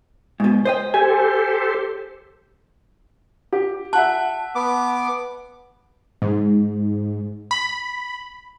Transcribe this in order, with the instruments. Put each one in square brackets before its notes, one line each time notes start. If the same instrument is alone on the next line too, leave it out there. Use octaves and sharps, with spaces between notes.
[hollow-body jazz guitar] G#2 B2
C5 D#5 G5
[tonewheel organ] G4 A4 C5 [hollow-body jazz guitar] G#5
[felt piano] G4
[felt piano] E5 F#5 F#6 [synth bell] A5
[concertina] B3 D6
[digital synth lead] G#2
B5